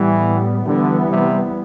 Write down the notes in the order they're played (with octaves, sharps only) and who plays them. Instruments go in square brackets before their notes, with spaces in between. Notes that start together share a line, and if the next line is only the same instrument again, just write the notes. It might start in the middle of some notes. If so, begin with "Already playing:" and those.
Already playing: [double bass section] A2 G3 B3 [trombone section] E3
[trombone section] D3 [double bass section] E3 G3 B3
[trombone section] C3